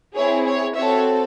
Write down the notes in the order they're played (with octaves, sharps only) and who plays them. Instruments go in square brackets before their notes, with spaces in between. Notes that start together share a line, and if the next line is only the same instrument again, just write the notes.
[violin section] C4 E4 G#4 C#5
C#5
C4 F#4 A4 C#5 E5